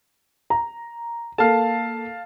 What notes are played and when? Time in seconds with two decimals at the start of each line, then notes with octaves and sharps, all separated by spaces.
0.50 A#5
1.38 A#3 A4 F5 A5